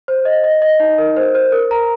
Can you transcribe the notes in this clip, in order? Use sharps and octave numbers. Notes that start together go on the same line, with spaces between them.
C5
D#5
D#5
D#5
D#4
A#4
C5
C5
A#4
A#5